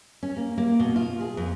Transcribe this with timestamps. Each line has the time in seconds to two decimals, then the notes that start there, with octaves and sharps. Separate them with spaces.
0.23 C#4
0.36 A#3
0.58 A#3
0.80 B2
0.96 F4
1.21 G#4
1.37 F2